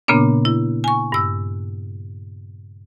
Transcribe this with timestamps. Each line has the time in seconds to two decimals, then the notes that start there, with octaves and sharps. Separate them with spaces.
0.08 A#2 C#3 A#3 B3 D4
0.45 E4
0.84 G#5 C#6
1.12 G2 E6